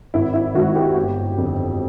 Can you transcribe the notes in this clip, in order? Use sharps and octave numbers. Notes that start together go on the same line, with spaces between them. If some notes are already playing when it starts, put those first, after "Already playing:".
G#1 E4
E4
G#2 D#3 F#4
G4
G1
F2 D3